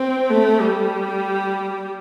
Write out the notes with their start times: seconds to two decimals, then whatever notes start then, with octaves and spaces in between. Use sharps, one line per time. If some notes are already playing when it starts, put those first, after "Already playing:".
Already playing: C4
0.30 A3
0.61 G3